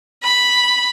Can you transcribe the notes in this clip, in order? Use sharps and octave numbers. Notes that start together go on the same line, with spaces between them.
B5